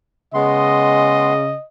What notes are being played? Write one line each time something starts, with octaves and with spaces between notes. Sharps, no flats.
C#3 G#3 B3 D#5 C6